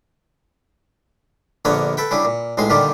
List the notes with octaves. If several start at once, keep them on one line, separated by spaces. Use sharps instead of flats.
A#1 D3 A#3 B3 C#5 F#5
A4 B4 G5
C#3 G3 D4 E4
A#2
B1 A2 G#3 G#4 C6
A#2 D3 D#3 G3 F4 G4